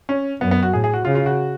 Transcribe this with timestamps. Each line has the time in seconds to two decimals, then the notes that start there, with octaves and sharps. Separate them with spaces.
0.09 C#4
0.41 F#2 B3
0.51 B3
0.63 F#4
0.73 A2 G#4
0.84 G#4
0.94 F#4
1.05 C#3 F4
1.15 F4
1.26 F#4